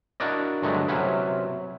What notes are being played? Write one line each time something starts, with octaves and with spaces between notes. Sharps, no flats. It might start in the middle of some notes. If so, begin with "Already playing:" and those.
D4 E4 F#4 A#4 D5 D#5
G2 D3 F#3 G#3 A3
C3 F#3 C#4 E4 B4